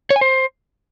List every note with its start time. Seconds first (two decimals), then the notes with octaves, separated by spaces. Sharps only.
0.10 C#5
0.16 G#5
0.21 C5